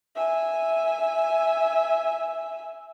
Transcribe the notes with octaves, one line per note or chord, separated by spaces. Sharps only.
E5 G#5